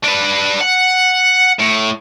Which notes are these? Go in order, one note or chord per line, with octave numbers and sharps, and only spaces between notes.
D4 B4
F#5
A2